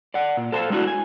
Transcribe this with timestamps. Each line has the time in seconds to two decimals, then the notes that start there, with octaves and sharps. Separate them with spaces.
0.14 D5 F#5
0.37 A#2
0.52 A4 C5 F5 A5
0.70 G#3 A3 D4 E4 F#4
0.87 G#5